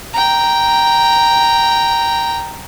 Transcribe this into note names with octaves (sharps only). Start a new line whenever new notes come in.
G5 A#5